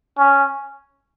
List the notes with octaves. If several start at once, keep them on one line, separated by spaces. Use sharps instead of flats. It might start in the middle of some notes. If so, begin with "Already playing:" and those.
C#4